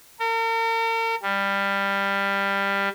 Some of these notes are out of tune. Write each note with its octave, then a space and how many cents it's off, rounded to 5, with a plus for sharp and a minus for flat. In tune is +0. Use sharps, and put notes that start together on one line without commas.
A#4 -40
G3 +15